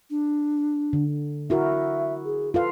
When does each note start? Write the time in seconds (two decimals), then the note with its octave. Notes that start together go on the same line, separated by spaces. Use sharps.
0.10 D4
0.93 D3
1.50 E4 F#4 A#4 E5
2.25 G#4
2.54 F4 A4 B4 F5